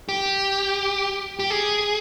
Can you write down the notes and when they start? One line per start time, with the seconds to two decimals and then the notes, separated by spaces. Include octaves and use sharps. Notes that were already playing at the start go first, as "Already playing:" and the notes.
0.09 G4
1.39 G4
1.50 G#4